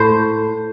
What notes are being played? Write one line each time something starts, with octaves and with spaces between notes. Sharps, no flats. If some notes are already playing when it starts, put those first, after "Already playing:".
Already playing: A2 C5